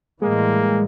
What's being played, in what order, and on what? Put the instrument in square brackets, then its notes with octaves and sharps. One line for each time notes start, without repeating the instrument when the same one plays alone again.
[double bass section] A2 E3 G3 [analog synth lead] G#3 [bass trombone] A#3